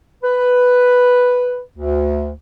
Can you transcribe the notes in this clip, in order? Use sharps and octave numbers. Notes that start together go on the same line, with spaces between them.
B4
D2